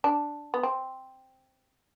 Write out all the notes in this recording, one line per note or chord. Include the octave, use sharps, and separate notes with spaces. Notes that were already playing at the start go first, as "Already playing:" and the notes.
D4
B3
C4